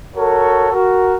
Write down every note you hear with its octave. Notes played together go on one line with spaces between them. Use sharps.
F#4 A4 A#4 C#5
F#4 A#4